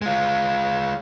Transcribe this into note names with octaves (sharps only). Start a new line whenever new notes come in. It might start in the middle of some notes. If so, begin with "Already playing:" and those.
G#3 F4